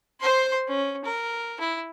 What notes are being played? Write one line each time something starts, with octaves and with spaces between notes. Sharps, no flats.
C5 C6
C#4
A#4
E4